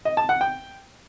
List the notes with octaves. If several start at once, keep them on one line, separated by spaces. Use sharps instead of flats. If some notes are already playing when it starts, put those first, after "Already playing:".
D#5
A5
F#5
G5